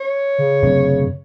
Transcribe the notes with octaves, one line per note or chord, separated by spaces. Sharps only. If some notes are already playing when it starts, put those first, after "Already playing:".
C#5
C#3
F#2 C3 C4